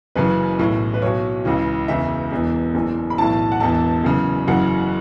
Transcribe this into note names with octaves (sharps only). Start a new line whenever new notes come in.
F#1 F#2 C#3 E3 B4
B1 A2 E3
B4
B1 B2 C#5
C#2 C#3 E3
E1 E2 C#3 E3 E5
E1 E2 E3
F#1 E2 E3
B5
B1 A2 E3 A5
F#5
E1 E2 E3 A5
F#1 F#2 C#3 E3
F#1 F#2 C#3 E3 F#5